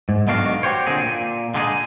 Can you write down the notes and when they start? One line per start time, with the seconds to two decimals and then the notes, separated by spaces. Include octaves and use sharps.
0.09 G#2
0.27 B1 B2 D#3 D4 F#4 F5
0.63 F#4 G4 C5 C#5
0.86 A#2 D3 C4 D#4 G#4
1.06 A#2
1.54 D3 G#3 D#4 E4 G#4